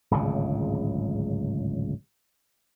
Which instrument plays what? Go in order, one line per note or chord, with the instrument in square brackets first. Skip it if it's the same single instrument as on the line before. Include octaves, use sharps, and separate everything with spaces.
[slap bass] D1 G#1 C#2 C#3